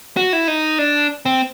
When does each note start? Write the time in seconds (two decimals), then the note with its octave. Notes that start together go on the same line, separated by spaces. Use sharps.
0.17 F#4
0.33 E4
0.48 D#4
0.79 D4
1.26 C4